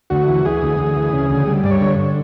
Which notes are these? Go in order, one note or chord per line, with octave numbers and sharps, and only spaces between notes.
D2 F#4
E3
E3 G#4
D2
D2
E3
C#3
D2
G3
G2 D5
C#5
D3